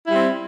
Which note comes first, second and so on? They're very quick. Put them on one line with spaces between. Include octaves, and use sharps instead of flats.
E4 G3 C4